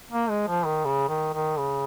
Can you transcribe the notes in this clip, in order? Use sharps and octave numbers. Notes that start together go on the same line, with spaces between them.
A#3
G#3
F3
D#3
C#3
D#3
D#3
C#3